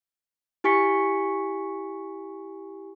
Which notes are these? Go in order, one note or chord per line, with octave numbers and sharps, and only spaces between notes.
E4 G4 G#5 C#6 B6 C#7